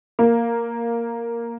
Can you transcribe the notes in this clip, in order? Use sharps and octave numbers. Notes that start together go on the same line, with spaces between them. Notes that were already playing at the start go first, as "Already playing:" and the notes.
A#3